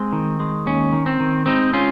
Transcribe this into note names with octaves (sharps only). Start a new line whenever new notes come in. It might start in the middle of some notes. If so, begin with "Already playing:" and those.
Already playing: G#3 C4
D#3
G#3
D#2 C#4
D#3
C4
D#3
G#3 C4 D#4
C#4 F4